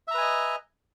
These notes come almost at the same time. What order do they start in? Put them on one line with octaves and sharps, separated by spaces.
E5 A#5 B4 G#5 D#5